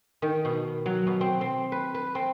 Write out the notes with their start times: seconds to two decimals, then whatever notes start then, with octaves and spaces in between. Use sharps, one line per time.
0.22 D#3
0.45 B2
0.86 F#3
1.07 B2
1.21 C4
1.41 C4
1.72 B4
1.94 B4
2.15 C4